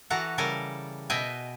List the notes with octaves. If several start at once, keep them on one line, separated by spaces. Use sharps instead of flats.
E3 F#4 A4 F#5 A#5
C#3 G3 A4 A#4 G#5 A#5
B2 B4 D#5 E5 G5 G#5